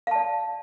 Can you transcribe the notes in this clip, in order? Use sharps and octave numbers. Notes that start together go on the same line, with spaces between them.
D5 F5 A5